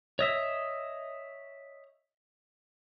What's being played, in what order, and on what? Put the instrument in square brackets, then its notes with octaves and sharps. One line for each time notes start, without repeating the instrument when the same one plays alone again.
[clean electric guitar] C#5 D#5 E5